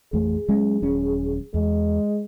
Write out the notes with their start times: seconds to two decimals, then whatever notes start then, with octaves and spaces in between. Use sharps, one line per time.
0.13 A1 F2 A3 G#4
0.48 F#3 G#3 C#4
0.82 D#1 F#3 C#4
1.54 E2 G#3